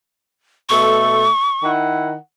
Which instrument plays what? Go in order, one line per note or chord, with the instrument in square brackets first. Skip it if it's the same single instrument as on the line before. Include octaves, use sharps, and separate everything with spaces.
[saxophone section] B2 A3 A4 [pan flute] C#6
[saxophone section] D#3 E4 F#5